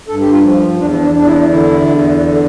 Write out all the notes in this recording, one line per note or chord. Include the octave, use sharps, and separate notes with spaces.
G2 A4
G4
F4
F3
E2 D4
D4
E2 D4
E4
D3 E4
E2
D3